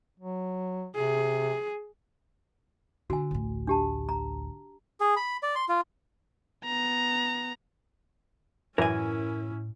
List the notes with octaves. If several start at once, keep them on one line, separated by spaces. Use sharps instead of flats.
F#3
C3 G#4
D3 F#4 G#5
A1 D2
D4 G4 A5
A#5
G#4
B5
D5
C6
F4
B3 A#5
F#2 A2 E3 C#4 E4 A#4 G#5